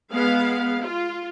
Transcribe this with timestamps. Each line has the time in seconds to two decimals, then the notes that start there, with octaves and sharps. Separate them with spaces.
0.11 G#3 B3 F5
0.83 F4